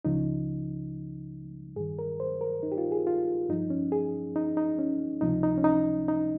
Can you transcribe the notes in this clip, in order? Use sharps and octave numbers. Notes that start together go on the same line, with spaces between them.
C#2 C#3 F3 D#4
G2 D#3 G#4
A#4
C5
A#4
D#4
G4
F4
G#4
F4
G2 F3 D#4
C#4
G#4
D#4
D#4
C#4
C#2 C3 F3 D#4
D#4
C#4
D#4
D#4